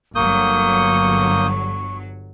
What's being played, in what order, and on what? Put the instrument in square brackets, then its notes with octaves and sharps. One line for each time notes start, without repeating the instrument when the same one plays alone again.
[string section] G1 F#3 [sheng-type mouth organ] A#3 D#6 G6 [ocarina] C#6